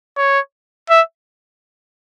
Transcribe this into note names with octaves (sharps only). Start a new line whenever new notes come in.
C#5
E5